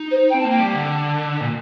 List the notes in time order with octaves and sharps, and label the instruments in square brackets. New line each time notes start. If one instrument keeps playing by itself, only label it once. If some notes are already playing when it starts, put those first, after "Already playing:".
Already playing: [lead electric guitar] D#4
[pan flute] C5
[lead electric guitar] C4 [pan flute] G5
[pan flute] A5
[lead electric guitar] A#3 [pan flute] G5
[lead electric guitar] G3
D3
[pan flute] A5
[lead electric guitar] A#2